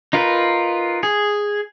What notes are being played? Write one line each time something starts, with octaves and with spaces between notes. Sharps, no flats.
D#4 F4 A#4 B4
G#4